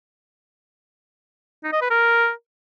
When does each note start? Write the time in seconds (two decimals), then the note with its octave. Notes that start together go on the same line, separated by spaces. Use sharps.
1.64 D#4
1.73 D#5
1.82 B4
1.91 A#4